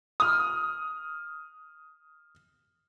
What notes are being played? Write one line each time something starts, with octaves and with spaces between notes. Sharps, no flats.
D#6 F6